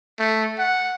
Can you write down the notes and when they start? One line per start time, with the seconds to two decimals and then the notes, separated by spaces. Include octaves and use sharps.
0.19 A3
0.59 F#5